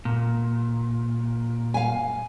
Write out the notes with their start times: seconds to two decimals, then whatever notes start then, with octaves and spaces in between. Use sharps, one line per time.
0.05 A#2
1.74 F5 G#5